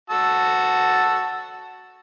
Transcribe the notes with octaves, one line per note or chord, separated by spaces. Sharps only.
F#4 A5 E6